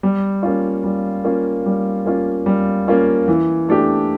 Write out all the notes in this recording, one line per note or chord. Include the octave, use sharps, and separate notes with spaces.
G3
A#3 C#4 F4
G3
A#3 C#4 F4
G3
A#3 C#4 F4
G3
A#3 C#4 F4
E3
A3 D4 G4